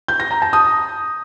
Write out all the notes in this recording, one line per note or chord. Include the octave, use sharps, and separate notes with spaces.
G6
A#6
A#5
A5
D#6